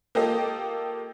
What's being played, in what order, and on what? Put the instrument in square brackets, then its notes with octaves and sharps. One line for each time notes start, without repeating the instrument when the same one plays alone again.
[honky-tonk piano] A#3 F4 G4 A4 D#5